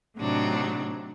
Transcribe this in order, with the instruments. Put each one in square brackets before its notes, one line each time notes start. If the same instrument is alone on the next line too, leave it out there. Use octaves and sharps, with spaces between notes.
[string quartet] A2 C3 F#3 D4 D#4